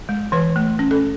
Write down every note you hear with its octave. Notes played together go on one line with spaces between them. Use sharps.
G#3
E3 B4
A3
C#4
A4